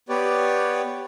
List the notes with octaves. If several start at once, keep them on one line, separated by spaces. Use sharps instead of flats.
B3 G4 B4 C#5 D5